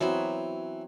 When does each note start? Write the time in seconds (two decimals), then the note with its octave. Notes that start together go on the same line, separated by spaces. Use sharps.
0.01 E3 F#3 B3 C4